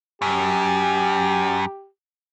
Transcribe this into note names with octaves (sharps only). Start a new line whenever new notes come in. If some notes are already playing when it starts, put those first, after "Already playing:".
F#2 G4